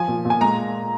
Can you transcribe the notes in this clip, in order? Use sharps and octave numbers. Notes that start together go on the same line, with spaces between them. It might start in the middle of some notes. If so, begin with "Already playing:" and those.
Already playing: F3 G#5
A#2
A#2
G#5
G#3 A#5